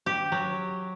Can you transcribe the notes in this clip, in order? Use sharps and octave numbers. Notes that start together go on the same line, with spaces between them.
G4
F#3